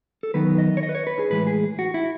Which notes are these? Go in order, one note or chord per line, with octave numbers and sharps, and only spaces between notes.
A4
D#3 F#3 B3 D#4 B4
D#5
C#5
D#5
B4
C#5
B4
G#4
A2 E3 G#3 B4
G#4
F#4
E4